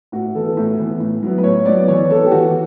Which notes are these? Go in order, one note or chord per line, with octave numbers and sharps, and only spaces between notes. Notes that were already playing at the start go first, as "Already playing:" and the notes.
A2 F#4
E3 B3 A4
A2
E3 B3
A2
F#3 B3
B4
A2 C#5
F#3 B3 D5
E3 C#5
B3 A4
G4
E3 F#4